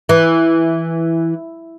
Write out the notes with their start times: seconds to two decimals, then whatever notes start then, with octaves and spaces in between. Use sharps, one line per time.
0.09 E3